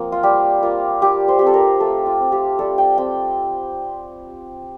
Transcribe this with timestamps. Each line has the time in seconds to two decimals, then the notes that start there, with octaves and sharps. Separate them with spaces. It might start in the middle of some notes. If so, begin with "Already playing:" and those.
Already playing: F3 A#3 C4
0.12 F4
0.23 G3 G4
0.63 A#3 F4
1.02 G3 G4
1.28 C5
1.39 C4 G4
1.47 A4
1.54 A#4
1.80 A3 A4
2.06 F4
2.19 C4
2.32 G4
2.59 G3 A4
2.78 G5
2.98 C4 G5